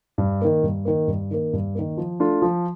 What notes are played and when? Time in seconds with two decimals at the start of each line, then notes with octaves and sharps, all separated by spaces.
0.18 G2
0.41 D#3 A#3
0.63 G2
0.85 D#3 A#3
1.08 G2
1.31 D#3 A#3
1.53 G2
1.75 D#3 A#3
1.97 F3
2.20 A3 D4 F4
2.42 F3